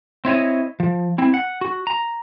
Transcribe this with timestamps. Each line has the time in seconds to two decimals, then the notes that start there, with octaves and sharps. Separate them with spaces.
0.25 C4 E4 C#5 D#5
0.80 F3
1.18 C4 E4
1.34 F#5
1.61 F#4
1.87 A#5